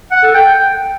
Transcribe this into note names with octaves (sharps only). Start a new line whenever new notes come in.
F#5
A4
G5